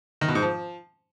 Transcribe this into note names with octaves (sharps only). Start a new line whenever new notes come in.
D#3
B2
G#2
F3